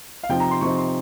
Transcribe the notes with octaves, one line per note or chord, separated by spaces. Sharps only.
F5
C3 F3 C4 D#4 G5
A#5
C6
C3 F3 C4 D#4 C#6
C6